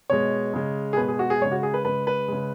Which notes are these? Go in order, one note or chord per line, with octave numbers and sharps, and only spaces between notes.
B2 G#3 C#5
C#3 G#3
G#4
B2 G#3 B4
G#4
F#4
G#4
C#3 G#3 C#5
F#4
G#4
B4
C#3 G#3 B4
B4
C#3 G#3